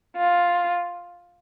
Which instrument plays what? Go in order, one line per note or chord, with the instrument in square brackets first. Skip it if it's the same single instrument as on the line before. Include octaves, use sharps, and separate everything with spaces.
[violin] F4